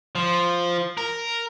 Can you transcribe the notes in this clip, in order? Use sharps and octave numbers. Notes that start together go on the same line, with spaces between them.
F3
A#4